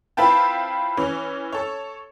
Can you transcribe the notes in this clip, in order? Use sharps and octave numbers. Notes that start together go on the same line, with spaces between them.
C4 E4 F4 B4 G5 A5
E3 C#4
A4 C#5